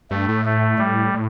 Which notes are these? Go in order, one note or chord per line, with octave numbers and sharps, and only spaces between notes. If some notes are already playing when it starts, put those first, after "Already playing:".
G2 A3
A2
A3
A2 G3
A2